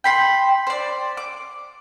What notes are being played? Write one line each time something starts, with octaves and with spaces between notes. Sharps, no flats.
G5 B5 C6
C5 D5
D6